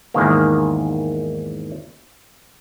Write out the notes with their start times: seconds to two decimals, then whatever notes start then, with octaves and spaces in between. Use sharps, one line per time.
0.14 E2 G#2 D#3 A#3